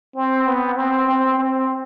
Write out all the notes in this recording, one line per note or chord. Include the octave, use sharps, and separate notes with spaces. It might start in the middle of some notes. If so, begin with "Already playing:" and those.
C4
B3
C4
C4
C4